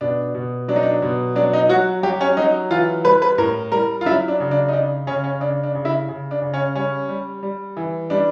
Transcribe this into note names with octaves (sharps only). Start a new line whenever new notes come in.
B2 D4
B2
F#3 D4
D#4
D4
B2
F#3 D4
D#4
F#3 F#4
F#3 G4
C#4
F#3 D#4
E3 F4
G3 B4
B4
A2 A#4
G3 A#4
F4
F#3 E4
D4
C#3
D4
D#4
C#3 D4
C#3 C#4
C#4
C#3 D4
D4
C#3
E4
C#3
D4
C#3
C#4
G3 C#4
G3
G3
E3
G3 D4